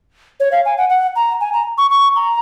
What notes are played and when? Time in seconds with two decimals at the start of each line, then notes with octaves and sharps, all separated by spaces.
0.40 C#5
0.52 F5
0.65 G#5
0.77 F#5
0.89 F#5
1.16 A#5
1.41 G#5
1.53 A#5
1.78 C#6
1.91 C#6
2.16 A#5